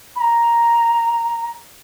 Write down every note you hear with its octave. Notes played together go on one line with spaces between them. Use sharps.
B5
A#5